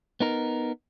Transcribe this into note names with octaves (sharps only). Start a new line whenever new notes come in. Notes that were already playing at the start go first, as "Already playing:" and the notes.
B3 D#4 A#4